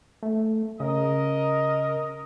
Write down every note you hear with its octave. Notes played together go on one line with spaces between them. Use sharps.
A3
C#3 A#4 D#5